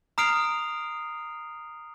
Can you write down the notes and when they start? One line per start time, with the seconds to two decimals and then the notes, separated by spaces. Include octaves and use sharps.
0.18 A#5 D#6 F6 C7 D7 F7